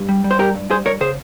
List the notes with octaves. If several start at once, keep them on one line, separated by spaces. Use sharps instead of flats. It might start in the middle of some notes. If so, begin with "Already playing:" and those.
Already playing: G2
G3
G3
C5
G2 G4 A#4
G2
G2 G#4 C5
G2 A#4 C#5
C#3 G#4 C5